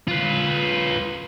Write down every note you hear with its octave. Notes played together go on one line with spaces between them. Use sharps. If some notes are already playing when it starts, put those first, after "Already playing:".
F4 B4